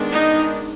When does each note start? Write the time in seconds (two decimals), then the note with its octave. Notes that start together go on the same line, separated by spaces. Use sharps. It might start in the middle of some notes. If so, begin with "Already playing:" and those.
Already playing: D#3 G#3 B3 D4
0.11 D#4